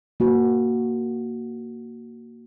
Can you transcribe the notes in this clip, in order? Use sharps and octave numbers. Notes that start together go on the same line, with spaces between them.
A#3 F#4